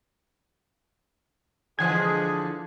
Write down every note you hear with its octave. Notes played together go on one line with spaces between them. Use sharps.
D3 E3 F3 G#3 G#4 G#6